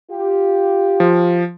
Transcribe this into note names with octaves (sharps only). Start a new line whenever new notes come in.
F4 G4
F3